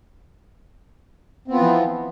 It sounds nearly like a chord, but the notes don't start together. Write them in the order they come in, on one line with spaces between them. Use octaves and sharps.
C4 B3 F4 E3 F3